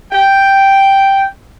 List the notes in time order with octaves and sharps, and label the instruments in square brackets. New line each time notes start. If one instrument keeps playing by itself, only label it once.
[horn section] G5